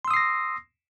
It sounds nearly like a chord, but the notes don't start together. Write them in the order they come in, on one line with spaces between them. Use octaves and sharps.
C6 E6 D#6 C7 A#6